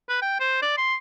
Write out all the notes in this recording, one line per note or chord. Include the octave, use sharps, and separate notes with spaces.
B4
G5
C5
D5
C6